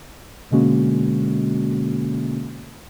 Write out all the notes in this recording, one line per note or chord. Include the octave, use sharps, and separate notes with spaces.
B2 D3 G#3 A#3 C#4 F#4